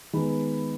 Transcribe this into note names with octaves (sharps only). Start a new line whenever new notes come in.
D#3 G#3 B3 B5